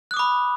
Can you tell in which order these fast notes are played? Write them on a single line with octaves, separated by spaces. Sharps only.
F#6 D#6 D6 B5